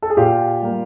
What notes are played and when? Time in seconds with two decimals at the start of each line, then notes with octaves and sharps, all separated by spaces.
0.02 A4
0.10 G#4
0.17 A#2 F4 G4
0.62 G3 A#3